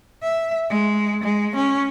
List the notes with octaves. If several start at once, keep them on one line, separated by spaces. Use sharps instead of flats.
E5
G#3
G#3
C#4